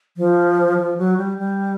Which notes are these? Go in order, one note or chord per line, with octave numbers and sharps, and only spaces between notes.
F3
F3
F#3
G3
G3